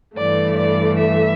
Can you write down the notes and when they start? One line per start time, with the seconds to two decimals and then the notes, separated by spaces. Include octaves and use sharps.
0.17 G2 E3 A3 D5
0.57 D5
0.98 E5